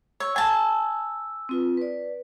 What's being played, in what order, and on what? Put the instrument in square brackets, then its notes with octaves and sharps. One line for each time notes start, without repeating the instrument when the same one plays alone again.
[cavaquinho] C#5 [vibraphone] E6
[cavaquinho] G#5 A5
[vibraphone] C4 F4 B4
B4 D5